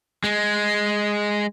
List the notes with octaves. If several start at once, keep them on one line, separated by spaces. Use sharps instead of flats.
G#3